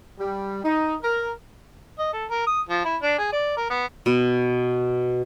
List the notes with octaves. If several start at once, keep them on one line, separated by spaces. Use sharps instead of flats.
G3
D#4
A#4
D#5
A4
A#4
D#6
F3
E4
D4
G#4
D5
A#4
B3
B2